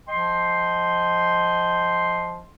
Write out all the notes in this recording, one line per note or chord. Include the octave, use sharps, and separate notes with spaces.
F3 D#5 G5 C6